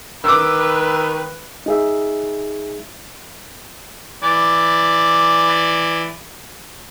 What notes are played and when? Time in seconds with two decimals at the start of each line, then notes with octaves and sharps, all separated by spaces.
0.24 D#3 B4 D6 E6
1.66 D#4 G#4 E5
4.23 E3 D5